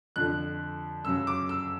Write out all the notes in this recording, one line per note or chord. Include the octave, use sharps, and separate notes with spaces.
F2 D3 F3 F#6
F#2 C#3 F#3 E6
D6
E6